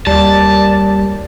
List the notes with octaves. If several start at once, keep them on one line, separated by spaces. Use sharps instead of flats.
D#2 G3 D5 A5